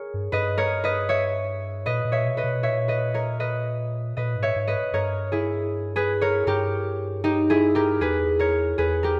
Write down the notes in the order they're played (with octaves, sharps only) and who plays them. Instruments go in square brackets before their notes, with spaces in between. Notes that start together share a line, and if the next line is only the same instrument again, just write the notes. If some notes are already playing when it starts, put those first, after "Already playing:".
Already playing: [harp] G#4 A#4 C#5
[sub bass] G2
[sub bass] G2 [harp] B4 D#5
[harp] A#4 C#5
B4 D#5
C#5 E5
[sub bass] A#2 [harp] B4 D#5
[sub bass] A#2
[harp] C#5 E5
[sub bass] B2
[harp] B4 D#5
[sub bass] B2
[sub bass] A#2 [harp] C#5 E5
[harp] B4 D#5
A#4 C#5
B4 D#5
[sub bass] A#2 [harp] B4 D#5
[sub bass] G#2
[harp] C#5 E5
[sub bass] G#2
[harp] B4 D#5
[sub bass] G2 [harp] A#4 C#5
[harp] E4 G#4
G#4 B4
A#4 C#5
[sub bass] G2 [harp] G4 A#4
[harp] D#4 G4
E4 G#4
G4 A#4
[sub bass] E2 [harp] G#4 B4
[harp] A#4 C#5
[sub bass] E2 [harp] G#4 B4
[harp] G4 A#4